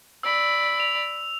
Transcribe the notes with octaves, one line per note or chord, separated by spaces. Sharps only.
D5 B5 E6
F7